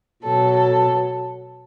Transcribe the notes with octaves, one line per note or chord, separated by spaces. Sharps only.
B2 F#3 A4
A4